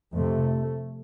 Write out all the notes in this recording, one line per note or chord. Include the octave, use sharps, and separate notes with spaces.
F2 C3 A3